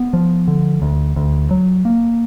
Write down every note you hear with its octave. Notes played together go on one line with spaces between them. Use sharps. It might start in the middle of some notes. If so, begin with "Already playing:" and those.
Already playing: B3
F3
D3
D2
D2
F#3
A#3